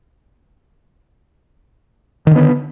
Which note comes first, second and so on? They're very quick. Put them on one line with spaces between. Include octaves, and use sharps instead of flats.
D#3 D3 B3